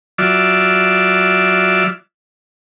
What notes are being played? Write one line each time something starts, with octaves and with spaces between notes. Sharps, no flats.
F#3 F4 D5 E5